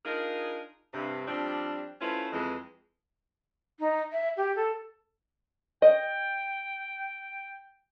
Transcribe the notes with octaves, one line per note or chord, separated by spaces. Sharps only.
D4 D#4 F4 G#4 A#4
G2 C3
F3 G3 C4 D4
A3 C#4 E4 F4 B4 C5
F2 E3 G#3
D#4
E5
G4
A4
D#5 G5